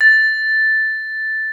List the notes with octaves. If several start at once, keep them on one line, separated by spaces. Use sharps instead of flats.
A6